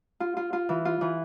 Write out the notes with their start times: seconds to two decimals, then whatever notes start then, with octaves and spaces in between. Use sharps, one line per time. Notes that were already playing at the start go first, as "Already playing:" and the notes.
0.20 F4
0.37 F4
0.53 F4
0.69 E3
0.85 F4
1.01 E3